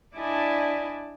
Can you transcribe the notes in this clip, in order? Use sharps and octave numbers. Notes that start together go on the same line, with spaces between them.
D4 E4 D5 D#5 G#5 A5